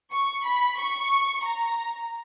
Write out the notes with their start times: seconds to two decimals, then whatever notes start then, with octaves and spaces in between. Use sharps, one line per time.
0.12 C#6
0.46 B5
0.79 C#6
1.44 A#5